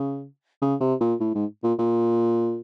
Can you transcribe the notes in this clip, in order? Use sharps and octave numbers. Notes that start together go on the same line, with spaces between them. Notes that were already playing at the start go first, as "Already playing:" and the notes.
Already playing: C#3
C#3
C3
A#2
A2
G#2
A#2
A#2